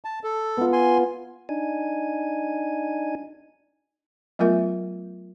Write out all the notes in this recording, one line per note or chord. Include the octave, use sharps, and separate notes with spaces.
A5
A4
B3 F4
G#5 C6
D4 D#4 G#5
F#3 A3 B3 F4 A#4 E5